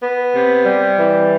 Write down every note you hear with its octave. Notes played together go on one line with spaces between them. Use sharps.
B3
C3
G3
E3